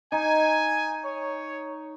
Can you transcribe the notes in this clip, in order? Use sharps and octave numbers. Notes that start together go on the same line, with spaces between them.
D#4 G#5
C#5